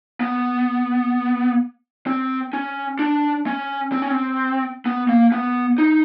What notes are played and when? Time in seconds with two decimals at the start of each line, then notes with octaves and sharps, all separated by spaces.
0.21 B3
2.07 C4
2.53 C#4
2.99 D4
3.47 C#4
3.92 C4
4.02 C#4
4.10 C4
4.86 B3
5.09 A#3
5.32 B3
5.78 D#4